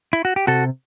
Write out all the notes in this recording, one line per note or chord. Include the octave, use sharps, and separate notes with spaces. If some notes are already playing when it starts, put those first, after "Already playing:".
E4
F#4
G4
C3 F#4 A4